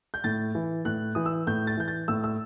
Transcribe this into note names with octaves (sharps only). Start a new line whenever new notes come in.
G6
A2 A6
E3
A2 F#6
E3 D#6
E6
A2 G6
A6
E3 G6
A6
A2 E6
E6